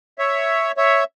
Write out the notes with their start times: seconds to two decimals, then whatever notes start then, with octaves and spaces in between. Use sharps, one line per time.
0.18 C#5 E5
0.77 C#5 E5